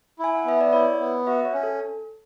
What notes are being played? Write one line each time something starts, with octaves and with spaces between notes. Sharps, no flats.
E4 G#5
F#5
B3 E5
D5
E4 C#5
B3
F#4 E5
C#5
C#4
A4